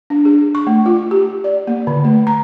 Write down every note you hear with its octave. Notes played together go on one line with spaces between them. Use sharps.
D4
G#4
C#6
A3
F4
G4
D5
A#3
D3
A3
A#5